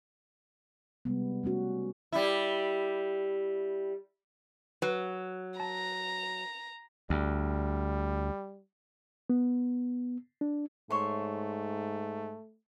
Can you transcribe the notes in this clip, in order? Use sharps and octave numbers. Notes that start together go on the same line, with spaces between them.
C3 G3 G#3 B3
G3 A3 C#4 F#4
G3 E4
F#3 B4
A5 A#5
D2 G3
B3
D4
G#2 A3 C#5 E5 C6